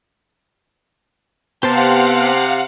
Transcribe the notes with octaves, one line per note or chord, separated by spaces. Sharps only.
C3 B3 G4 C5 F5 F#5 A5